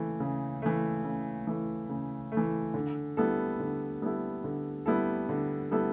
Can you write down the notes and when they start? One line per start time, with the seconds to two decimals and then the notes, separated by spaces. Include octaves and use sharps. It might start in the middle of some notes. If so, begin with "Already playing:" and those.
Already playing: C#3 E3 A3
0.20 C#3
0.62 E3 A3
1.05 C#3
1.47 E3 A3
1.89 C#3
2.32 A3
2.37 E3
2.74 D3
3.17 G3 B3 E4 A4
3.59 D3
4.02 G3 B3 E4 A4
4.44 D3
4.86 G3 B3 E4 A4
5.29 D3
5.71 G3 B3 E4 A4